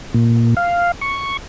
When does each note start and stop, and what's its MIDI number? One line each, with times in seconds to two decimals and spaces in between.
0.14 0.54 46
0.57 0.92 77
1.01 1.37 85